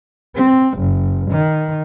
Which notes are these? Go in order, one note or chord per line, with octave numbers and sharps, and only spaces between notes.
C4
F#1
D#3